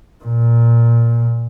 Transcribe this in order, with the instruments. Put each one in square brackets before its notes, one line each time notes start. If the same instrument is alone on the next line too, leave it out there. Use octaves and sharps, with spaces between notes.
[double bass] A#2